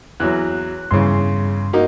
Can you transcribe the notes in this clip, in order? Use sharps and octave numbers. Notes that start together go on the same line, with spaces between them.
E2 F#3 F#6
E2 G2 C#3 C6
A#3 D#4 F#4